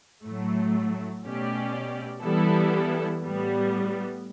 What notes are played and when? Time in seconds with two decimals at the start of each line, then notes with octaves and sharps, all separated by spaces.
0.24 A2 F#3 A3
1.24 B2 A3 C#4 G4 D5
2.23 E3 G3 B3 E4 A4
3.23 A2 G3 B3